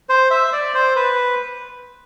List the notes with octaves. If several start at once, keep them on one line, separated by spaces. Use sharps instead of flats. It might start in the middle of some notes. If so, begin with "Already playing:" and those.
C5
E5
D5
C5
B4